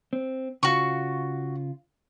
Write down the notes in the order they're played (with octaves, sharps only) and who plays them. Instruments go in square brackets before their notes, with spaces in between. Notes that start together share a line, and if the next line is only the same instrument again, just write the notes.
[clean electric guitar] C4
[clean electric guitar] C#3 F4 [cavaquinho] F#4 C#6